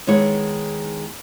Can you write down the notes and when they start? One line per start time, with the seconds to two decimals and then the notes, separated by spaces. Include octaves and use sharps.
0.07 D#3 G#3 B3 E4 C#5